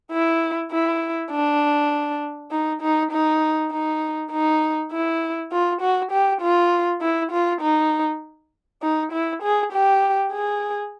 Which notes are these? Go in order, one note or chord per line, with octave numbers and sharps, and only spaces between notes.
E4
E4
D4
D#4
D#4
D#4
D#4
D#4
E4
F4
F#4
G4
F4
E4
F4
D#4
D#4
E4
G#4
G4
G#4